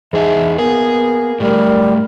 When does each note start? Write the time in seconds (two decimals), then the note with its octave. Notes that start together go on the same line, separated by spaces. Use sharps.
0.13 E2 G#2 G#4 E5 A5
0.58 A#3 B3 G#4 G#5
1.40 A2 G3 A3 D4 A#4